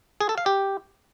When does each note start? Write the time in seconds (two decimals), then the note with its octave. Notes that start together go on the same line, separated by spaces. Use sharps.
0.21 G#4
0.29 A4
0.38 F5
0.46 G4